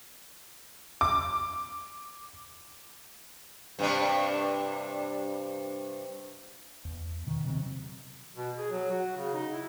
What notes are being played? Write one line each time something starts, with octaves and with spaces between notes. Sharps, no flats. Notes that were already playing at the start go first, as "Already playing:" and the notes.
D6
G2 C3 D4
E2
B2 D#3
C3 D#3 F#3 C4
B2
G#4
F#3
F#4
C#3
D#4
E4